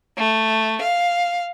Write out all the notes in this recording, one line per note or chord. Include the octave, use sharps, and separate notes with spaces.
A3
F5